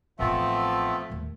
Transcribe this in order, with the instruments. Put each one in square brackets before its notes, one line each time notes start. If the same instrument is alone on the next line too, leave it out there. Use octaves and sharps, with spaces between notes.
[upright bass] A1 A2 [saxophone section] F3 A3 [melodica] B3 C4 E5
[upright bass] D#2 A2